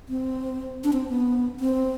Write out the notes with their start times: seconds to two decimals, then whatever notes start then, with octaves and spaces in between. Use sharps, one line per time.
0.09 C4
0.84 D4
0.93 C4
1.10 B3
1.60 C4